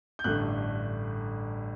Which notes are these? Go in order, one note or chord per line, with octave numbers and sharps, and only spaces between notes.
G6
A1 G2 D3 A3 F#6